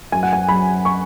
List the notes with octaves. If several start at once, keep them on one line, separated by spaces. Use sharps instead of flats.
F#2 G#5
F#5
G#5
F#3 B5
C#6